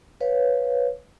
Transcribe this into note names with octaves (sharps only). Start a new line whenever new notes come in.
B4 C#5 F5